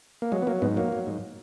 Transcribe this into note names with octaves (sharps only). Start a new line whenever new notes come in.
A#3
F#3 G#3
B3
F#3 A#3
G#2 B3
F#3 A#3
F#3
G#2